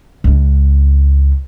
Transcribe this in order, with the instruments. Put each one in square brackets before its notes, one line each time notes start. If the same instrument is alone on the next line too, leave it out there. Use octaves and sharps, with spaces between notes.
[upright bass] C#2 D4